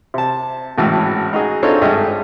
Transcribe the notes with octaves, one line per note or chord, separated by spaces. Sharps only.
C3 A5
G#1 A2 C#3 E3 F#4 A5
D#4 F#4 G#4
C4 D4 D#4 F4 A4 C#5
G#1 G2 G#4 A4 D#5 E5